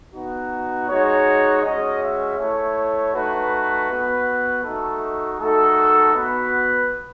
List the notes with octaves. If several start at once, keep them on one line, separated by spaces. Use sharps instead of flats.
B3 D#4 F#4
G#3 D#4 F#4 C#5
G#3 C#4 F#4 D#5
E5
A3 E4 C#5
A3 D#4 F#4 B4
B3 F#4
A3 D#4 F#4 A4
A3 D#4 F#4 A4
B3 F#4 B4